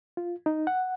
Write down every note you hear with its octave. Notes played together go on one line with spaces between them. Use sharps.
F4
D#4
F#5